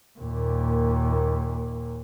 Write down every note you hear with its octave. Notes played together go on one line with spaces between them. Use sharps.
D#2 A#2